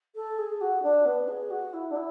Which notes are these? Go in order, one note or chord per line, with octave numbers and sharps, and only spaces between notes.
A4
G#4
F#4
D4
B3
G#4
F#4
E4
D4
E4